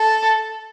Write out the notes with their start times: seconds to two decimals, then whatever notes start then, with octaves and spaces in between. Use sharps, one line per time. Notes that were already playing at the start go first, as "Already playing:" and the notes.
Already playing: A4